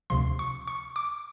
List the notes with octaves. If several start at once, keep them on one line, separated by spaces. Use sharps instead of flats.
D2 C3 F3 C6
C#6
C#6
D6